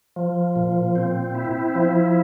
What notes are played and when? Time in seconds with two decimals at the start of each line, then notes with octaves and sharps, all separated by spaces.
0.16 F3
0.56 A#2
0.96 C4
1.35 E4
1.75 F3